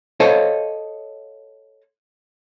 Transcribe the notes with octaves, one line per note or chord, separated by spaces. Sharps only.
A4 C5 C#5 D#5 F5 A5